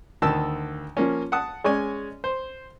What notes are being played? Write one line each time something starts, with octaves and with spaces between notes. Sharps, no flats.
D2 D#3 A5 E6
F3 A#3 C#4
F#5 A5 D#6
G#3 C#4 C#5 D5 G#5
C5